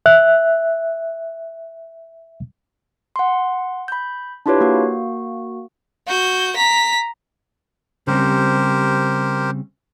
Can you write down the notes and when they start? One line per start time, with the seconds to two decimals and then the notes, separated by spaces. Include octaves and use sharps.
0.06 E5 F#6
3.16 F#5 C6
3.88 B5 G6
4.46 D4 E4 F4 G4 B4 C#5
4.60 A#3 F#4
6.07 F#4 G6
6.56 A#5 B6
8.07 C#3 G3 C4 G4 A#4 C5